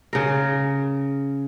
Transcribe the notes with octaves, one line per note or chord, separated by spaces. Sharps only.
C#3 A#4